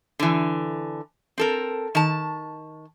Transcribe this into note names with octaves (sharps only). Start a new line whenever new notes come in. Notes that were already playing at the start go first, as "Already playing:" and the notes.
D3 E3
C4 A4 A#4
D#3 A5